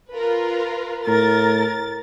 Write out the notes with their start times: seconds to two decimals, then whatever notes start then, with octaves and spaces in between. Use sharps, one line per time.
0.14 F4 A#4 B4
1.07 A2 A#4 A6